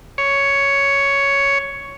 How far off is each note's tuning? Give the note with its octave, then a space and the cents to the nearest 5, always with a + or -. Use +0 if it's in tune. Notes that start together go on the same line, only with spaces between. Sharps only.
C#5 +5